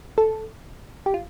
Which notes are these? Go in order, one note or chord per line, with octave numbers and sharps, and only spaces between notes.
A4
G4
F4